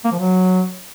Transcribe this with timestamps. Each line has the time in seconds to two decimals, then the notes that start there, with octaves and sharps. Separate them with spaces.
0.05 A#3
0.12 F3
0.19 F#3